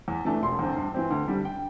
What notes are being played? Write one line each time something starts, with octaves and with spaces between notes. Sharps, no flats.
E2
E3 A3 D4 A5
E1 C6
E2 D3 C4
G2
E3 C4
D2
D3 G3
G5